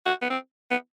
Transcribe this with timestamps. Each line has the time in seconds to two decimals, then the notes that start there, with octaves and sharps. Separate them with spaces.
0.06 F#4
0.22 B3
0.30 C4
0.71 B3